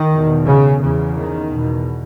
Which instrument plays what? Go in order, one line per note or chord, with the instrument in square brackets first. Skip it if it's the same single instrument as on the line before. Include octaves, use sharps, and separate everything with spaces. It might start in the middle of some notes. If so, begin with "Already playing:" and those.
Already playing: [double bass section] D#3
E2 B2
C#3
E2 C#3
D#3
E2 B2